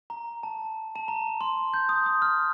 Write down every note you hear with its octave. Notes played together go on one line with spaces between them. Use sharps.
A#5
A5
A5
A#5
C6
G6
D#6
D#6
F6